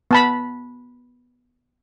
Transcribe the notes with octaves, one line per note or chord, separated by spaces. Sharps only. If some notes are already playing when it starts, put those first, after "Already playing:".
B3 A5 B5